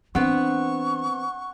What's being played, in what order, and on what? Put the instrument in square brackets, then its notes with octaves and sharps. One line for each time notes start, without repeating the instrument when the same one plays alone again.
[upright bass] E3 D4 [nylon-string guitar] B3 C4 [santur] F#5 [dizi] C#6